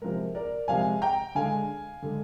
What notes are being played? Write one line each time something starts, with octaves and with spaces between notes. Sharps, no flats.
C3 F3 G#3 A#4
A#4 D5
C3 F3 G#3 F5 G#5
G5 A#5
D3 G#3 F5 G#5
D3 G#3